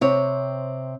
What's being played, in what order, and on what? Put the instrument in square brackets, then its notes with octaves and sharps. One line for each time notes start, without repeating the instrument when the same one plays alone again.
[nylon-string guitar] C3 C4 C#5